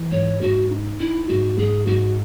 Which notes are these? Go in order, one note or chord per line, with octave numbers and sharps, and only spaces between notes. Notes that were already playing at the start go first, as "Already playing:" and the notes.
Already playing: E3
G#2 C#5
G#2 F#4
D#4
D#4 E4
G#2 F#4
G#2 G#4
G#2 F#4